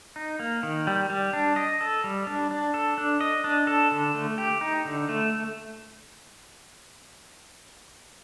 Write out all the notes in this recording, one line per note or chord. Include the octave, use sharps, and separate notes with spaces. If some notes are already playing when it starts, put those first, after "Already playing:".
D#4
A#3
D#3
G3
G3
D4
D#5
A4
G3
D4
D4
A4
D4
D#5
D4
A4
D3
A3
G4
D#4
D3
A3